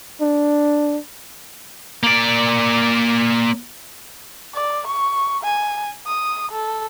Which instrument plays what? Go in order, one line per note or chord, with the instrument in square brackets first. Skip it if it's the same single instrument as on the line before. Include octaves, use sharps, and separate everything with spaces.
[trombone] D4
[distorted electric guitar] A#3 D5
[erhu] D5
C#6
G#5
D#6
A4